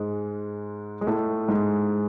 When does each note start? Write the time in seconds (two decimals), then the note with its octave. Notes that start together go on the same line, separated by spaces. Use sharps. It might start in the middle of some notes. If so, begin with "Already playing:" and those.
Already playing: G#2 G#3
1.01 G#3
1.07 A2 A3
1.48 G#2 G#3